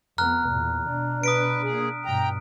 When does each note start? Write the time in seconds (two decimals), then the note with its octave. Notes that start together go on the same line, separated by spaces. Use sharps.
0.18 F2 B3 A#5 F6 F#6
0.47 E2 A#2
0.87 B2 D4
1.24 B4 D#6 B6 D7
1.63 A#2 G#4
2.05 G2 B2 G5 A#5